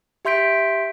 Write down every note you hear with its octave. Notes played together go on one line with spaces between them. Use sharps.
G4 E5 C6 G6 B6 D7